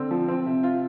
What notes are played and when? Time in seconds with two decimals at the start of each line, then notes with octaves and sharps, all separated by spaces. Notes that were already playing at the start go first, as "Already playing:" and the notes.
Already playing: D3 C4
0.11 F3
0.28 C4
0.46 C3
0.63 F4